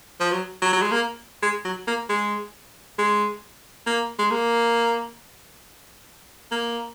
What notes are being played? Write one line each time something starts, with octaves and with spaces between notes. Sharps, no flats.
F3
F#3
F#3
F#3
G#3
A#3
G#3
F#3
A#3
G#3
G#3
A#3
G#3
A#3
A#3